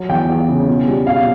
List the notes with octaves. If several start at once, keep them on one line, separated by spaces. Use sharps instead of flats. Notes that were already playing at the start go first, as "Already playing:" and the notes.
Already playing: F#3
E2 G5
E2
C#3
B2
G3
B2 F5